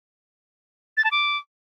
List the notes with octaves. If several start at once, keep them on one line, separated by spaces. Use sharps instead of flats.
A6
A5
D6